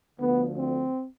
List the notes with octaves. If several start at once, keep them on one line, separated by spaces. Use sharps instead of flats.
D2 D3 F3 B3
C4